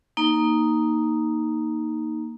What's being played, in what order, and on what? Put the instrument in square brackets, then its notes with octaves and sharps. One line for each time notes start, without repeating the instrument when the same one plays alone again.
[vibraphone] A#3 D#4